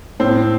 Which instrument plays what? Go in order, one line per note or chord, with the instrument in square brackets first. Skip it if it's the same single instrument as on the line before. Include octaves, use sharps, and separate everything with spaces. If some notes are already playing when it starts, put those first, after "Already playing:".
[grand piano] A2 [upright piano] C4